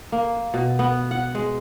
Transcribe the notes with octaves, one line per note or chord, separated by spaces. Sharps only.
A#3
B2
B3
F#5
G#3